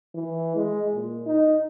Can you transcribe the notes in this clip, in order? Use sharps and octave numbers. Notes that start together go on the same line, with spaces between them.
E3
G#3
A#2
D#4